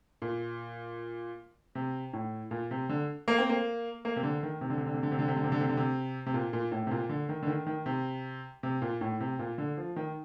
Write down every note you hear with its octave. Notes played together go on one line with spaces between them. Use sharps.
A#2
C3
A2
A#2
C3
D3
A#3
C4
A#3
A#3
C3
D3
D#3
C3
D3
C3
D3
C3
D3
C3
D3
C3
D3
C3
D3
C3
D3
C3
C3
A#2
A#2
A2
C3
A#2
D3
D#3
D3
D#3
D#3
C3
C3
A#2
A2
C3
A#2
D3
F3
D#3